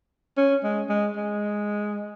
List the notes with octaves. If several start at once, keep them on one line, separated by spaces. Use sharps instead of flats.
C#4
G#3
G#3
G#3